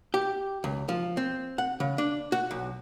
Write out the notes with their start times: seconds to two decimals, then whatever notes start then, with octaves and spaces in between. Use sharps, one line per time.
0.14 G4
0.64 C#2
0.89 F3
1.17 C4
1.58 F#5
1.80 C#3
1.98 D4
2.32 F#4
2.51 B1